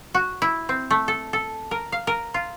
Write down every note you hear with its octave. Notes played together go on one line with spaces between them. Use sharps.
F#4
E4
C4
A3
A4
A4
A#4
F5
A#4
F4